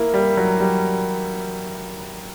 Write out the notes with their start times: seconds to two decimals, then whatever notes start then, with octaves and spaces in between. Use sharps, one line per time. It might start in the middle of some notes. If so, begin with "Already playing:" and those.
Already playing: A#3 E4
0.14 G3
0.37 F#3
0.60 G3